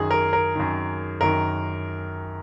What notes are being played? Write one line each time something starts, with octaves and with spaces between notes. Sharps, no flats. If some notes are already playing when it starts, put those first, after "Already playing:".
Already playing: F#2 D#3 G#4
A#4
A#4
F#2 D#3
F#2 D#3 A#4